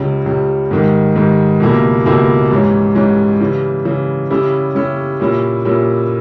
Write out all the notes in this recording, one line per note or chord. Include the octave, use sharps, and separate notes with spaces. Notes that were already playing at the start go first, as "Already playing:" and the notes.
Already playing: C#2 C#3 G3
C#2 C#3 G3
G#2 D#3 G3
G#2 D#3 G3
C#2 B2 G3 A#3 E4
C#2 B2 G3 A#3 E4
G#2 E3 G3 C#4
G#2 E3 G3 C#4
C#3 E3 G3
C#3 E3 G3
C#3 G3 C#4 E4 G4
C#3 G3 C#4 E4 G4
A#2 G3 C#4 E4
A#2 G3 C#4 E4